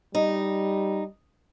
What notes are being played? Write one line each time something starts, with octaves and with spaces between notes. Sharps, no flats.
G3 D#4